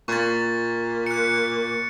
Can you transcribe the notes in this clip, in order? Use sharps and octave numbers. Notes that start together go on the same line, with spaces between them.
A#2 C#6 A6
F#6 C#7